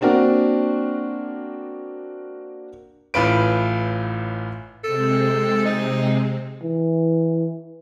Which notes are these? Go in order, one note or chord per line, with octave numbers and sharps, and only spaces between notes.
A#3 C4 D4 F#4 A#4
A1 A2 F4 B4 D7
C3 G#3 C4 A4
D#4
E3